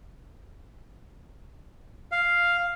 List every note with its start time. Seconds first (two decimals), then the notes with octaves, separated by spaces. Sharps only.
2.12 F5